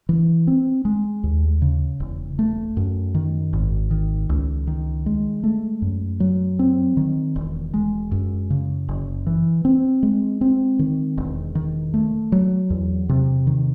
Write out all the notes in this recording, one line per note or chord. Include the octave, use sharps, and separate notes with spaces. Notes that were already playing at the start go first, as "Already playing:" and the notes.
E3
C4
G#3
D#2
C#3
E1
A3
F#2
D#3
G#1
D#3
C#2
D#3
G#3
A3
F#2
F#3
C4
D#3
E1
G#3
F#2
C#3
F#1
E3
C4
G#3
C4
D#3
E1
D#3
A3
F#3
E2
C3
D#3